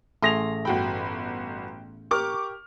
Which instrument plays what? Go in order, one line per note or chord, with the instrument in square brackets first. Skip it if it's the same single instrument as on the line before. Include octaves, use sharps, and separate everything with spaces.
[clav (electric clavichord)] A1 A3 G#4 [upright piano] C6 A#6 F7
[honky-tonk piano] G1 F#4 B5 [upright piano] G5
[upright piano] G4 A#4 [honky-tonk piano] C#6 D6 F6